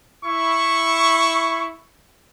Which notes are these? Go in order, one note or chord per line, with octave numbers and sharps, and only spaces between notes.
E4 C#6